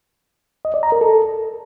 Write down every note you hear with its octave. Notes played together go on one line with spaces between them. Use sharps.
D#5
D5
A#5
A#4
A4